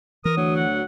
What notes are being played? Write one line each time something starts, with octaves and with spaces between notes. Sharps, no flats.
E3 A#4 D#6
D2 F#3
F#5